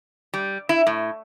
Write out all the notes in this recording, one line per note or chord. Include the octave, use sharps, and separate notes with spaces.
G3
E4
A2